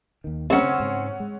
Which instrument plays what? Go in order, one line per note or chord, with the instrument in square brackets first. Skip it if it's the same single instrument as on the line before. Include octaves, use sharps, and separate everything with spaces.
[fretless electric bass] D#2 D#3
[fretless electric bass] F#3 A3 A#3 [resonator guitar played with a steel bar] C4 C#4 [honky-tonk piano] C#5 F#5
[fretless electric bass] C#3
G#2 C#3
G#3